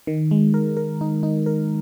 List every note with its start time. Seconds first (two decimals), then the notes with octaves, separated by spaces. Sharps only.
0.07 D#3
0.31 G#3
0.54 A#4
0.77 A#4
1.01 D#4
1.23 D#4
1.46 A#4